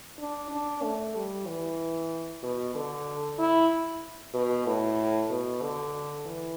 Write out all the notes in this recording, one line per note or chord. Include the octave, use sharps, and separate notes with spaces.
D4
D4
A3
G3
E3
B2
D3
E4
B2
A2
B2
D3
E3